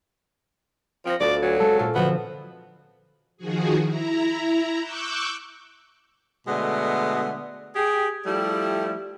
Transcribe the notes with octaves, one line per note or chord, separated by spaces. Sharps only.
F3 C4 A#6 C#7 D7
D2 B3 F4 A4 D5
F#3 G#5
G#3 C4 C#4 A4
A#2 F4 A4
B2 D3 F3 B3 C4
D#3 F3 F#4 G#4
E4 A#5
C#6 D6 E6 F#6 G6
B2 D3 G#3 A3 B3
G4 G#4
F3 G3 A3 E4 G4